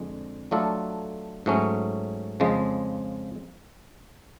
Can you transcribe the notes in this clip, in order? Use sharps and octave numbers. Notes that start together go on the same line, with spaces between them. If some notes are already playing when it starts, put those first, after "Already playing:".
Already playing: F2 D3 G#3
F#3 A3 D4 F4 A4
G#2 F#3 A3 C#4
F2 C#3 F3 G#3